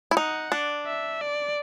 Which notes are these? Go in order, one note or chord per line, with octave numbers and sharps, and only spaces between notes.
E4
D#4 F#5
D4
E5
D5